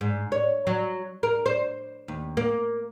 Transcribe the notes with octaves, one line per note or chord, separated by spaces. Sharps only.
G#2
C#5
F#3
A#4
C5
D#2
A#3